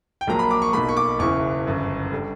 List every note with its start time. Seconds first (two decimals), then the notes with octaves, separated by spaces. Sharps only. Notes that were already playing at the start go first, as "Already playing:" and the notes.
0.21 G5
0.27 A#1 A#2 F#3 A#3 A#5
0.39 B5
0.51 D6
0.62 C#6
0.73 B1 B2 A#3 B5
0.89 C#6
0.97 D6
1.19 F#1 E2 C#3 E3 C#6
1.66 G1 F#2 C#3
2.11 D3 G3